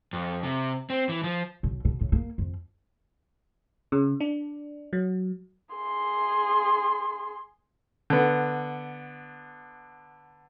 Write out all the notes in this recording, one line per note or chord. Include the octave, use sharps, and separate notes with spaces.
F2
C3
C4
E3
F3
B1
B2
A2
A#3
F2
C#3
D4
F#3
G#4 C6
D3 B3